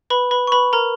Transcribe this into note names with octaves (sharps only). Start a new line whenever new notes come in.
B4 B5
B4 B5
C#6
B4 B5
A#4 A#5